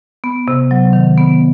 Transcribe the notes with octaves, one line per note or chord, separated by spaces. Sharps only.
B3
C3
F#3
D#3
B3